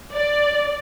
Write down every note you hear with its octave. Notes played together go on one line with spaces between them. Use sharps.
D5